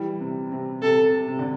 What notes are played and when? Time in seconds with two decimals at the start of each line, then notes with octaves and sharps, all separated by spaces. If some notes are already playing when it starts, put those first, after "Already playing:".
Already playing: E3 G3
0.20 C3
0.52 C3
0.82 C3 A4
1.28 C3
1.39 D3